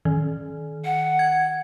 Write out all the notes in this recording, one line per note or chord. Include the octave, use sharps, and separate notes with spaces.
D#3
F#5
G#6